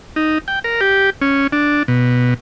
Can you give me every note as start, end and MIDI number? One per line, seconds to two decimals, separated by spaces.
0.16 0.38 63
0.48 0.59 79
0.64 0.81 70
0.81 1.10 67
1.21 1.47 61
1.52 1.83 62
1.88 2.34 47